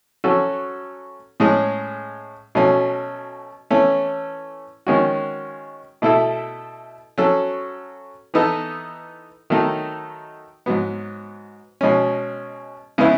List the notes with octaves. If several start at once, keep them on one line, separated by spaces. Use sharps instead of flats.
F#3 C#4 F#4 A4
A2 G#3 C#4 G#4
B2 F#3 A3 C#4
E3 A3 C#4
D#3 G#3 C#4 F#4
B2 A3 E4 A4
F#3 C#4 F#4 A4
E3 B3 D#4 A4
D#3 F#3 A3 D#4
G#2 F#3 B3
B2 G#3 C#4
C#3 G#3 B3 E4